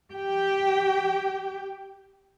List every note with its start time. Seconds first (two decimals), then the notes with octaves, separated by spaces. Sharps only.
0.14 G4 G5